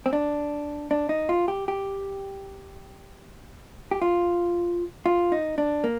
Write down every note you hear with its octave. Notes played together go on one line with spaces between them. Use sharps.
C4
D4
D4
D#4
F4
G4
G4
G4
F4
F4
D#4
D4
A#3